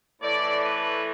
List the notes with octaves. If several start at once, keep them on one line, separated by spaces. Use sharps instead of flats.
A2 E3 A3 D5
B4